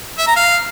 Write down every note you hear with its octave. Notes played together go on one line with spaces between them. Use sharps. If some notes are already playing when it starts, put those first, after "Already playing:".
E5
A#5
F5